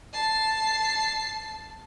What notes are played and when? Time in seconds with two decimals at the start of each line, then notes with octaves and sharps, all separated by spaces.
0.13 A5 C7